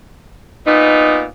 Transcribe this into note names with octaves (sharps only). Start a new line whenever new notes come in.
A#2 B3 D#4